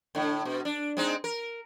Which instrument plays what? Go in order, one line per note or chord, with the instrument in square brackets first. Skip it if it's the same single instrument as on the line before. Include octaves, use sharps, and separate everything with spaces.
[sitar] A2 D3
B2
D4
G#3 C4 D#4
A#4